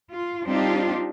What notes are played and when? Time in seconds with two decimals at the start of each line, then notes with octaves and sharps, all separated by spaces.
0.11 F4
0.45 G3 C4 D4 D#4 F4 G4